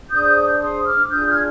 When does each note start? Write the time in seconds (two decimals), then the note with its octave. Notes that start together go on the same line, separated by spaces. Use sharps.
0.10 D4 G#4 C5 D#6 G6
0.61 C6 D#6
0.85 D6 F6
1.10 D4 F4 G#4 D#6 G6
1.28 F6 G#6